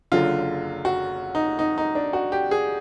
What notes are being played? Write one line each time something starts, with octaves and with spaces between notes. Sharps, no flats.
F#1 F#2 D3 F4
F#4
D#4
D#4
D#4
D4
F#4
G4
G#4